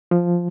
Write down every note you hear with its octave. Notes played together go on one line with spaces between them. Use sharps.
F3